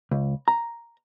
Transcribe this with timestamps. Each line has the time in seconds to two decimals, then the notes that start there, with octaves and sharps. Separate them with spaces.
0.11 C#2
0.48 A#5